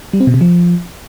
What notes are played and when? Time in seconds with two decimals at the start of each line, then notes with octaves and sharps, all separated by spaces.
0.13 G3
0.20 C4
0.27 B2
0.34 C3
0.41 F3